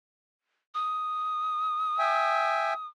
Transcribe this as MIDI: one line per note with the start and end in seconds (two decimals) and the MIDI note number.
0.74 2.87 87
1.99 2.74 76
1.99 2.74 79
1.99 2.74 80